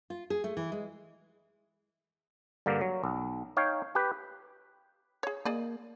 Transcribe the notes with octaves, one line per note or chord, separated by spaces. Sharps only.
F4
G#4
A3
E3
G#3
G2 D3 A#3
F#3
B1
D#4 C#5 F5 G5
G4 B4
G#4 C#5
A#3 G#4 D5 D#5